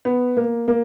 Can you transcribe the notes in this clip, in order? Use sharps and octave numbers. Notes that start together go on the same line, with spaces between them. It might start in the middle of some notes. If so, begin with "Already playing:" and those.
B3
A#3
A#3